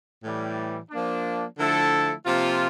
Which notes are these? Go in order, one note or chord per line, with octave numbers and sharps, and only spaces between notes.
A2 E3 G3
F3 A#3 D4
D3 F3 A3 E4 A4
C3 F3 A#3 F4